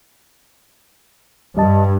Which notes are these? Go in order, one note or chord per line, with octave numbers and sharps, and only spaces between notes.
G2 G3 D#5 A5